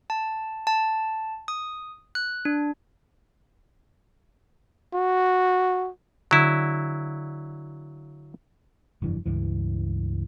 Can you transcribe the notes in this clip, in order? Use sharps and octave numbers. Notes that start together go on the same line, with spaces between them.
A5
A5
D#6
F#6
D4
F#4
D3 F#3 E4 G#4 F5
F1 G2 E3
C#2 G2 E3